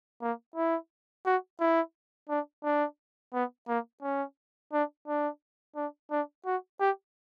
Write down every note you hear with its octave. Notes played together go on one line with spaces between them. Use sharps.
A#3
E4
F#4
E4
D4
D4
B3
A#3
C#4
D4
D4
D4
D4
F#4
G4